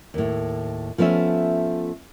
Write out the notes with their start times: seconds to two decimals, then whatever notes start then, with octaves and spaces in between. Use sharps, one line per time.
0.14 D#2 A2
0.98 F3 A3 B3 C#4 E5